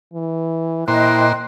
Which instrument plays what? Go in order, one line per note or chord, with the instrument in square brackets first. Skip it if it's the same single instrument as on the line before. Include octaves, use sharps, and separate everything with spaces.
[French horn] E3
[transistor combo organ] A#2 C5 [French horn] E4 [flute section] D#5 G5 F#6